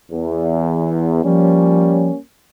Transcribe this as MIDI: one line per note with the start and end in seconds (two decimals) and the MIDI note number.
0.11 1.22 40
1.24 2.10 53
1.24 2.17 55
1.24 2.17 58
1.24 2.17 61